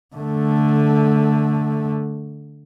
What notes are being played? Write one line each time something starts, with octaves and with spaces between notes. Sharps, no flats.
D3 A3